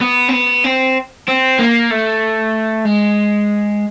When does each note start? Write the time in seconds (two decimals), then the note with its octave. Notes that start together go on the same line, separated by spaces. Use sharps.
0.01 B3
0.29 C4
0.33 B3
0.64 C4
1.28 C4
1.59 A#3
1.91 A3
2.85 G#3